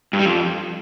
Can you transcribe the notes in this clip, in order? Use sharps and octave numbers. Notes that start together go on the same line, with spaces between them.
G2
G3
F2